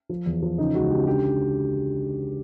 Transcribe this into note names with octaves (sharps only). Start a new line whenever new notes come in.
F3
E2
F3
C#3 D#4
C#2 F#4
C#3 G4
D3 G4